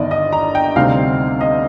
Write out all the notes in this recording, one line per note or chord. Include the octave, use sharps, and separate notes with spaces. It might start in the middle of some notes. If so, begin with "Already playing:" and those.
Already playing: G1 G2 D#3 D5 D#5
D#5
A#5
G5
D2 C3 G3 C4 D#4 F5
D#5